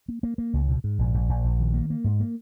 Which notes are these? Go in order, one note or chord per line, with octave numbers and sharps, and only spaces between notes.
A#3
A#3
A#3
C#2
B2
G#2
A#1
A#1
A#1
A#1
D#3
A#3
A#3
G#2
A#3